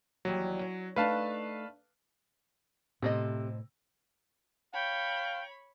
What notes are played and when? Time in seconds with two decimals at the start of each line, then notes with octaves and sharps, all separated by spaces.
0.25 D#2 E3 F#3 G3
0.61 C#4
0.96 A3 D4 D#4 B4 F5 A5
3.02 A2 C3 A3 C4 D#5
4.74 C#5 F5 G5 B5 C#6